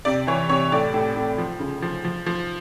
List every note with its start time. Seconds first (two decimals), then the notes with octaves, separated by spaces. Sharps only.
0.05 C3 D5
0.27 E3 C#5
0.49 C3 C#5
0.72 A2 D5
0.94 A2
1.16 A2
1.38 F3
1.59 C#3
1.82 F3
2.05 F3
2.26 F3